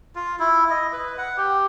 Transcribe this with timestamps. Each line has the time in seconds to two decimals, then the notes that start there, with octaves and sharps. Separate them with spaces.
0.15 F4
0.39 E4
0.70 D#5
0.93 B4
1.18 F#5
1.37 G4